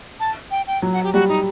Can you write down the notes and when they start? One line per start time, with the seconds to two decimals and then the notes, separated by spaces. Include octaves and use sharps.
0.20 A5
0.51 G5
0.67 G5
0.82 F#3
0.93 F#5
1.03 G4
1.13 G3 F#4
1.29 D#4